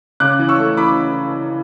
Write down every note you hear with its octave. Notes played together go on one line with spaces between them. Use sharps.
C#3 D6 F#6
E3
C#6 E6
A3
E3 B5 D6